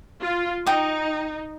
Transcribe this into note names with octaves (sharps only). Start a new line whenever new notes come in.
F4
D#4 G5 D#6